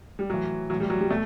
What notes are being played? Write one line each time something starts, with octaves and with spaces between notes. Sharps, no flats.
G3
A2 E3 F#3
A2 E3 F#3
G3
F#3
G3
B2 A3